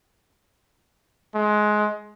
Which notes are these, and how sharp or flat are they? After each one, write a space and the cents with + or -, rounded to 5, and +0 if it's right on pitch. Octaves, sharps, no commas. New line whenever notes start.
G#3 +20